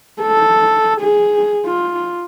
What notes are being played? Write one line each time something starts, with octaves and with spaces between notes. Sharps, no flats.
A4
G#4
F4